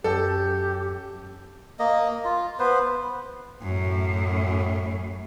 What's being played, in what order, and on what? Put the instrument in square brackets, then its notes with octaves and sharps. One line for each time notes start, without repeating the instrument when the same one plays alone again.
[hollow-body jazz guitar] F#2 [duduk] G4 [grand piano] A4
[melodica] A#3 D#5
F4
B3 B4 C5
[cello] F#2 A2